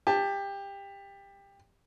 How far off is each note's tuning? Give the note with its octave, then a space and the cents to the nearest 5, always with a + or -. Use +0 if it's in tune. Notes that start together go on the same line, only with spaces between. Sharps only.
G4 +20 A5 +0